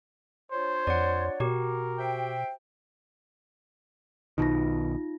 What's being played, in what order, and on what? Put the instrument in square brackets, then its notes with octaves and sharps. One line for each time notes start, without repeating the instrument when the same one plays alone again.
[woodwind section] D4 F4 C#5 [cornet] C5
[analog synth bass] F2 [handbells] D5 F#5
[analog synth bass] B2 [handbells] F#4 G4 [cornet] A#4
[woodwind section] C5 E5 G5
[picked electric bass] B1 B2 D#3 [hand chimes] D#4 F4 A#6